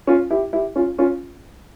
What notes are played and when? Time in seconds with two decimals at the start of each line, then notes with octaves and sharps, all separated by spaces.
0.07 C#4 F4
0.30 E4 G4
0.53 E4 G4
0.76 C#4 F4
0.98 C#4 F4